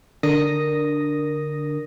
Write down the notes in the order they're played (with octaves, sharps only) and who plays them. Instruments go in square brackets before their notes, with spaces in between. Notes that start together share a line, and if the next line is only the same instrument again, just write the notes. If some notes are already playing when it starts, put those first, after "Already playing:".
[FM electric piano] D3 D4 A#4 D#6 A#6